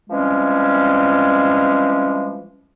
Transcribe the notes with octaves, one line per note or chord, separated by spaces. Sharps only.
E3 F3 G3 G#3 C4 C#4